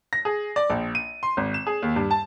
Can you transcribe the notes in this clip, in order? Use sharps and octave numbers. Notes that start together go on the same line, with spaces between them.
A#6
G#4
D5
A#1
D#7
C6
G#1
E7
G#4
D#2
G2
A5